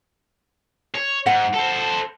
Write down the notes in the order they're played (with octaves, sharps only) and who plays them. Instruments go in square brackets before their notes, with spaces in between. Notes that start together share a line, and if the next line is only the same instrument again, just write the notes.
[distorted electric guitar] C#5
[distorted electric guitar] G#2 [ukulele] F#5
[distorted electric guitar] A4 C5